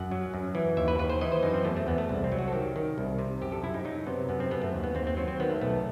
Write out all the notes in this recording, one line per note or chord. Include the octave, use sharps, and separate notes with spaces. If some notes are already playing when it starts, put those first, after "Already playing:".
Already playing: F#2 F#5
F#3
F#2
E3
D#2 E5
B4
D#2 B4
C5
E3 D#5
C5
F#2 D#4
C4
E2 A3
A3
E2 B3
A3
C2
C4
F#3
F#4
A4
D#3 G4
D#3
C2
C3
F#2 G4
A4
F#2 E4
D#4
F#3 D#4
C3 B3
F#2 B3
C4
F#2 B3
A3
D#2
B3
D#2 C4
C4
F#3 C4
C4
D#3 B3
A3
B1 A3